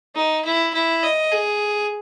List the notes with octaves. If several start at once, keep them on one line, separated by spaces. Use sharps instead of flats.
D#4
E4
E4
D#5
G#4